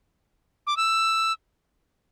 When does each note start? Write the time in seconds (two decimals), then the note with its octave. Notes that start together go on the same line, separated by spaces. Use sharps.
0.67 D6
0.77 E6